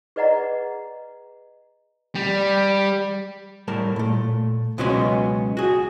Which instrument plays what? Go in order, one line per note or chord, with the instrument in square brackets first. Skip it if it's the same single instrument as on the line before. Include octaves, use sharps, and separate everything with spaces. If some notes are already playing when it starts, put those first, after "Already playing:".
[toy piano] G#4 B4 D5 D#5 F#5 A#5
[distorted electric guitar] G3
[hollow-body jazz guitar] A2 G3 A#4 A5
A#2 A3
C#2 B2 F#3 G#3 B3 C#4
F#4 G#4